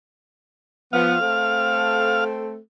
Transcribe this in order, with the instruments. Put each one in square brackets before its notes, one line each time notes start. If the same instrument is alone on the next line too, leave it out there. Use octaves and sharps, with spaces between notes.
[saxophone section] F3 B3 [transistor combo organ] F5
[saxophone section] A3 C4 A4